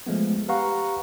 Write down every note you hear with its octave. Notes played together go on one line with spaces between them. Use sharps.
F3 G#3 A3 B3
G4 B4 F5 F#5 A#5 C#6